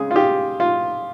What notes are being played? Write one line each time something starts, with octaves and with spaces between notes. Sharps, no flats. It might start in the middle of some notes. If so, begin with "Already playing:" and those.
Already playing: C#3 G#3 C4 G#4
F4
G4
F4